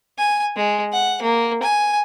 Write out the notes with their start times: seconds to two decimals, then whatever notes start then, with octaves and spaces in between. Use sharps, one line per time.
0.18 G#5
0.57 G#3
0.93 F#5
1.22 A#3
1.63 G#5